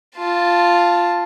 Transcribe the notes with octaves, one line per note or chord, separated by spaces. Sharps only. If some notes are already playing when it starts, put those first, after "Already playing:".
F4 A5